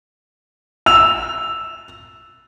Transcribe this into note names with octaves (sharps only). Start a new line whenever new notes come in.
E6 F7